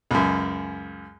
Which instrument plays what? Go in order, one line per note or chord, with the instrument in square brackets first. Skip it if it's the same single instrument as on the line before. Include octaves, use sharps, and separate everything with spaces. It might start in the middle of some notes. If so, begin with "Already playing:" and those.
[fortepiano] C#2 F#2